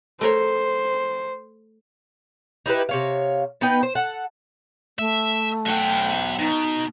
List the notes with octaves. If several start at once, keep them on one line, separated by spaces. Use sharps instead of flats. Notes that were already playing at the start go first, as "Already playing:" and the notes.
A3 A#4 C5 C#5
D#4 E4 G4 B4
C3 C#5 F5
B3 D#4 B4 G5
C5
A4 F#5
A3 E5
B1 E5 F#5 G5
B2 D#4